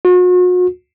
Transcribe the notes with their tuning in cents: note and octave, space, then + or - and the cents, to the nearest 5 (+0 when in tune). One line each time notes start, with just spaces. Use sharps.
F#4 -40